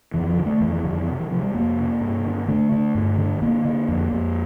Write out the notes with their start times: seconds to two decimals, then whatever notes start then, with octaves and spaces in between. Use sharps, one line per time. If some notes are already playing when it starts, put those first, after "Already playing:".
0.14 F2 E3
0.29 F3
0.37 D3
0.46 A3
0.61 F2 E3
0.73 E3
0.84 F2 D3
0.96 E3
1.08 C3
1.19 E3
1.31 C3 F3
1.43 G3
1.54 F2 A#3
1.79 C3
2.01 G2
2.25 D3
2.48 D3 A3
2.72 D3
2.95 G2
3.18 D3
3.42 D3 A#3
3.65 D3
3.88 F2
4.12 F2